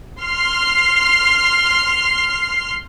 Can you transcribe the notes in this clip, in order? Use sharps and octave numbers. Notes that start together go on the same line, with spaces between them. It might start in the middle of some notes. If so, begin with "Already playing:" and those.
C6 F6 C7